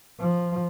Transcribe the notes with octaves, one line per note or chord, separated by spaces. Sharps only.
F3